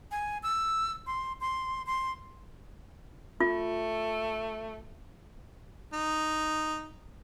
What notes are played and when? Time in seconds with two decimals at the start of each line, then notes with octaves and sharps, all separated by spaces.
0.11 G#5
0.43 E6
1.07 C6
1.41 C6
1.86 C6
3.40 A3 F4
5.93 D#4